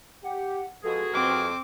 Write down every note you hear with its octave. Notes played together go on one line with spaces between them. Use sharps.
G4 F#5
F3 G#3 B3 F#4 G#4 A4
F2 C4 D6 F6